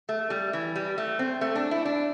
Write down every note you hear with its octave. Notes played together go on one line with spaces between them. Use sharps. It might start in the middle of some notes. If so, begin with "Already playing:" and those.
A3
G3
E3
G3
A3
C4
A3
D4
E4
D4